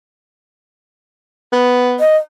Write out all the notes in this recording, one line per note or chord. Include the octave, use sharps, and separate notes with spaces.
B3
D#5